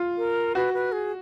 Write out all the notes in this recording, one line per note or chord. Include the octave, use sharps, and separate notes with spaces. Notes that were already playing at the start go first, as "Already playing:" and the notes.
Already playing: F4
A#4
F#4 B4
B4
G#4